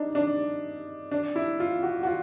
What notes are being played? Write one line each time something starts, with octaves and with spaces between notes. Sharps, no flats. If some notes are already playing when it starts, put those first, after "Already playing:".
Already playing: D4 D#4
D4
D4
E4
F4
F#4
F#4
F4